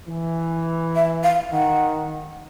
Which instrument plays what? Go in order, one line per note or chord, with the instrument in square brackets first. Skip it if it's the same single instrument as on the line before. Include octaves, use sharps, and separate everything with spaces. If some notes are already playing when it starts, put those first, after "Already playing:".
[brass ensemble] E3
[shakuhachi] E5
F5
[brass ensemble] D#3 [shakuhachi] F#5